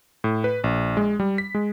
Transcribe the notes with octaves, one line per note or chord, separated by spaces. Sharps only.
A2
B4
A#1
G#3
G3
B6
G#3